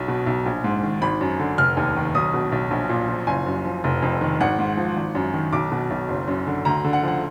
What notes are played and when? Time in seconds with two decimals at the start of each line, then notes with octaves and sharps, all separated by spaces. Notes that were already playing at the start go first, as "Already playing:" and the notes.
Already playing: B1
0.08 B2
0.26 B1
0.46 A#1
0.64 G#2
0.83 D#3
1.01 G#1 B5
1.21 F#2
1.39 D3
1.58 F1 F6
1.77 D#2
1.96 D#3
2.14 B1 D#6
2.34 B2
2.52 B1
2.71 A#1
2.89 A#2
3.08 F3
3.27 F#1 G#5
3.46 F#2
3.65 F3
3.84 F1
4.02 F2
4.21 D#3
4.40 G#1 F#5
4.59 G#2
4.77 F3
4.96 G#1
5.15 F#2
5.34 D#3
5.52 B1 D6
5.72 B2
5.90 B1
6.09 F#1
6.28 F#2
6.47 D3
6.65 D2 A#5
6.84 D3
6.93 F#5
7.03 F3 F#5